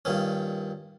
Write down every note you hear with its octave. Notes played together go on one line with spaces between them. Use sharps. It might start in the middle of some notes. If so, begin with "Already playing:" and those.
G2 A#2 D#3 C#4